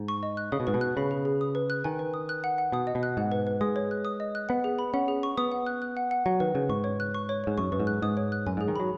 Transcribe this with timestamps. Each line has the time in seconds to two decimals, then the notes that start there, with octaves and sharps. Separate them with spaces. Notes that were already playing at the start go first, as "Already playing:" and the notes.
Already playing: G#2
0.08 C#6
0.23 D#5
0.37 F#6
0.52 C#3 D#6
0.60 B2
0.67 G#2 B4
0.74 B2
0.81 F#6
0.97 C#3 B5
1.11 G#4
1.25 G#4
1.41 D#6
1.55 B4
1.70 F#6
1.84 D#3 G#5
1.99 B4
2.14 D#6
2.29 F#6
2.44 F#5
2.58 F#5
2.72 B2 D#6
2.87 D#5
2.95 B2
3.03 F#6
3.17 G#2 F#5
3.32 B4
3.47 B4
3.61 G#3 D#6
3.76 C#5
3.91 F#6
4.05 D#6
4.20 D#5
4.35 F#6
4.49 B3 F#5
4.64 G#4
4.79 B5
4.94 C#4 F#5
5.08 G#4
5.23 C#6
5.37 B3 D#6
5.52 F#5
5.66 F#6
5.82 F#6
5.97 F#5
6.11 F#5
6.26 F#3 F#5
6.40 D#3 B4
6.55 C#3 B4
6.69 G#2 C#6
6.84 C#5
7.00 F#6
7.14 C#6
7.29 C#5
7.44 G#2 C#5
7.58 F#2 C#6
7.72 F#2 B4
7.79 G#2
7.87 F#6
8.02 G#2 D#6
8.17 C#5
8.32 F#6
8.47 F#2 G#5
8.57 G#2 G#4
8.68 D#3
8.76 F#3 B5